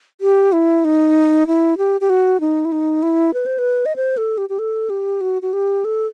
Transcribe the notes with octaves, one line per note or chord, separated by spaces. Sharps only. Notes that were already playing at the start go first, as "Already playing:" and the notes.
G4
E4
D#4
E4
G4
G4
F#4
D#4
E4
D#4
E4
B4
C5
B4
D#5
C5
A4
G4
G4
A4
G4
F#4
F#4
G4
A4